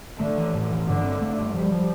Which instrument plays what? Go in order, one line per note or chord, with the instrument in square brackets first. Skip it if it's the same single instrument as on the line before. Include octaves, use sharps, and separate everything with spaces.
[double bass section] D3 [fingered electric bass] A3
[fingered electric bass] E3
A2
E3
[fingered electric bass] G2 [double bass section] D3
[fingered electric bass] C4
A3
G2
[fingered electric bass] F3 [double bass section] G3
[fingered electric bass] F3